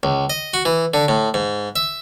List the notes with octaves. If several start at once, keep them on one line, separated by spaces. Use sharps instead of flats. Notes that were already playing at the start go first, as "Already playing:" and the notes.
C#2
D#5
F#4
E3
D3
A2
G#2
E5